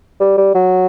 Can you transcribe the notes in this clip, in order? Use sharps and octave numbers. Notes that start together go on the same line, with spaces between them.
G3
G3
F#3